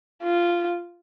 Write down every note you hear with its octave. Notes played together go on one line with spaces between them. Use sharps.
F4